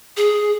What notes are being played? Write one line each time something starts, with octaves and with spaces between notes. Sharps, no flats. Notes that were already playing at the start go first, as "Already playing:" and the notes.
G#4